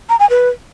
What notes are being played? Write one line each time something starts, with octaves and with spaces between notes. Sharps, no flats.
A#5
G#5
B4